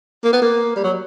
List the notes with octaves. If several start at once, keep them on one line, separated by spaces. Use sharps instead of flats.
A#3
B3
A#3
G3
F#3